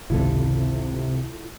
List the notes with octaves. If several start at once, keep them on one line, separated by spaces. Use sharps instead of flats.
G#1 C#2 C3 E4 F4 A4